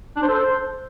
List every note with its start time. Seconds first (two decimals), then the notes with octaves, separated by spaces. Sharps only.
0.16 D4
0.22 C5
0.28 A4
0.35 C5